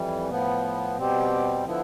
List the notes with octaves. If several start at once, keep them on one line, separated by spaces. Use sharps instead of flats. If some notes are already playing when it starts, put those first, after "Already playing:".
Already playing: F2 E3 G3
A2 F3 B3
B2 G3 C4 G4
D3 F3 B3 E4